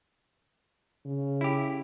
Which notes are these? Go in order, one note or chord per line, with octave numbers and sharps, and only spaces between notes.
C#3
E4 G4